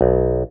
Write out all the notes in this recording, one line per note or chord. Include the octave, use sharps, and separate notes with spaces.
B1